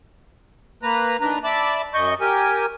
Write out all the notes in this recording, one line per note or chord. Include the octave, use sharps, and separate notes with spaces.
A#3 B4 A#5
D#3 D4 B4 A#5
D5 E5 A5 B5 D6
F#2 D#5 C#6 G6
G4 A#4 G#5